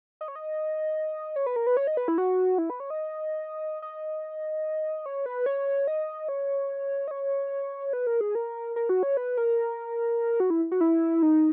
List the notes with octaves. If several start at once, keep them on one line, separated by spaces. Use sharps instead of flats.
D#5
C#5
D#5
C#5
B4
A#4
B4
C#5
D#5
B4
E4
F#4
E4
B4
C#5
D#5
D#5
C#5
B4
C#5
D#5
C#5
D#5
C#5
B4
A#4
G#4
A#4
A#4
F#4
C#5
B4
A#4
F#4
E4
F#4
E4
D#4